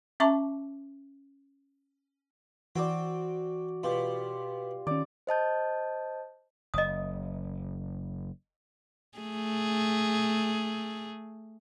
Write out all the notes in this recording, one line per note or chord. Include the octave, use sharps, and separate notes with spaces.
C#4 E5 A5 A#5 C#6 D6
E3 C4 F#4 D5
B2 F4 G4
D#3 C#4 D5
C5 D#5 A5 G6
F#1 D#5 D#6
A3 G#4